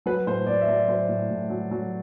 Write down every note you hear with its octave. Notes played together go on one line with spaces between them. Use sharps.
F#3 B4
A2 C5
A2 D5
E5
F#3 D5
F#3 C5
A2
A2
F#3
F#3